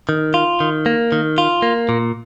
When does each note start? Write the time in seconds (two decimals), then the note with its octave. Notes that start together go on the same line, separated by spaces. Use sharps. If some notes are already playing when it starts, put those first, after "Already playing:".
0.09 D#3
0.34 F4
0.60 D#3
0.86 A#3
1.12 D#3
1.38 F4
1.62 A#3
1.89 A#2